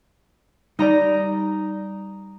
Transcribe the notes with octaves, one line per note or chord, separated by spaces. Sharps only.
G3 D#4 D5 A#5